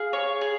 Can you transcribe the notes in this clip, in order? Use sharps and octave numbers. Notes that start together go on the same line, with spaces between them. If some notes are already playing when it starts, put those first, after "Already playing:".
Already playing: G#4 F5
C#5
G#4